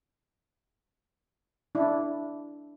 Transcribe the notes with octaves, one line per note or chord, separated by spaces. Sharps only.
D4 E4